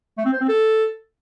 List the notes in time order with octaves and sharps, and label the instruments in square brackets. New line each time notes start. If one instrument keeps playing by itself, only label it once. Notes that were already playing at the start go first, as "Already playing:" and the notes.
[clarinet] A3
C4
C5
C4
A4